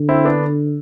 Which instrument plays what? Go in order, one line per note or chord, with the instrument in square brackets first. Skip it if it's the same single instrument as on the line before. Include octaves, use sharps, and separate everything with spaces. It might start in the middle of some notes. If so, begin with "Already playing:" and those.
Already playing: [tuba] D3
[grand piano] C4 E4
B3 D4